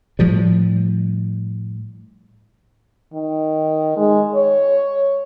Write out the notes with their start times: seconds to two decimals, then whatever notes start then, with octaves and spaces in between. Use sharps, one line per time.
0.19 A2 F3 G3
3.13 D#3
3.97 G#3
4.34 C#5